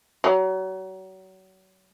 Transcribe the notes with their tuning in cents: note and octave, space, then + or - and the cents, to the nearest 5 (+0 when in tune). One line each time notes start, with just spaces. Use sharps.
F#3 +30